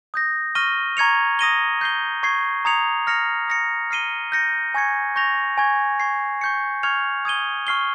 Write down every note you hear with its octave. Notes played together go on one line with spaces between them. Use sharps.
D#6 G6 A#6
C#6 F6 A#6 D#7 G7
A#5 C#6 G#6 C#7 F7
D#6 A#6 D#7 G7
G6 C7 G7
C#6 G#6 C7
A#5 D#6 G#6 C#7 F7
F6 A#6 C#7 F7
D#6 A#6 C#7
F6 C7 D#7 G7
G6 A#6 C#7
G#5 C#6 G#6 C#7
C#6 G6 A#6 F7
G#5 C#6 G#6
C#6 G#6 C7
C#6 G6 C#7
C#6 F6 G#6 C#7 F7
D#6 G#6 D#7 G7
C#6 F6 C7 G7